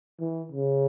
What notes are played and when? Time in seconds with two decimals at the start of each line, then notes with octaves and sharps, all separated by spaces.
0.20 E3
0.52 C#3